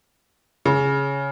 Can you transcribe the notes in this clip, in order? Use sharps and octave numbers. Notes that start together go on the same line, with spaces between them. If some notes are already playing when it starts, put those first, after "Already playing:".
C#3